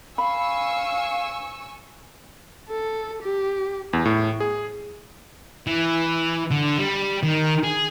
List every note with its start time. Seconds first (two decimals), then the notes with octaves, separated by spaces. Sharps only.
0.18 F5 G#5 B5 C#6 E6
2.70 A4
3.23 G4
3.93 E2
4.05 A2
4.40 G#4
5.67 E3
6.51 D3
6.79 G3
7.23 D#3
7.64 G#4